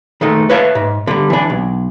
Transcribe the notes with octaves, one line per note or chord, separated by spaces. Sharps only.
D#3 G#3 A3
B4 C#5 E5 F5 A5
G#2
D3 G3
E3 D4
B1